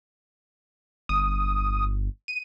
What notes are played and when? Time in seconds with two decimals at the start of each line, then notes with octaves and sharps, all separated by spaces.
1.09 G1 D#6
2.28 D#7